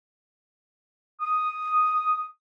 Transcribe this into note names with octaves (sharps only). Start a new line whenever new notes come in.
D#6